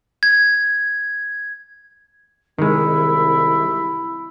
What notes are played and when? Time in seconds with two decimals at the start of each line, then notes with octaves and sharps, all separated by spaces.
0.23 G#6
2.59 C2 D#3 G#3 E4